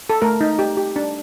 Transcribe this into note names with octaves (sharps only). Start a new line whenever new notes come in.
A4
A3 A#4
D#4
G4
G4
D4